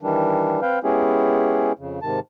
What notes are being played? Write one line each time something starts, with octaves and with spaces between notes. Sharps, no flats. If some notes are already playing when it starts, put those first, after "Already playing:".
D#3 E3 G3 D4
C4 B4 F5 G5
G#3 B3 C#4 E4 G4 G#4
F2 C#3
G#2 C3 D#3 A5